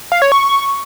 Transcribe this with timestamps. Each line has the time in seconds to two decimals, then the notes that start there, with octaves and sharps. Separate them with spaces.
0.12 F5
0.22 C#5
0.32 C#6